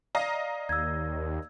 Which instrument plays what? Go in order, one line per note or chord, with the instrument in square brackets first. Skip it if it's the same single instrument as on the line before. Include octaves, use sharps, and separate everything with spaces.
[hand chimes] D5 [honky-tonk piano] D#5 F5 A#5
[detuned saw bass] D#2 [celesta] E6 G#6